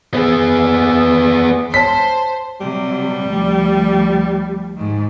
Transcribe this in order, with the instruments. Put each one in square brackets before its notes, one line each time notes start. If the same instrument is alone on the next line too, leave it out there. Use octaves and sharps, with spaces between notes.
[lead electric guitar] B3 G#4
[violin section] C5 [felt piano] C#5 A5 [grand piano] B6
[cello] C3 F#3 [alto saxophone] G3
[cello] D2 F3
G#2 D#3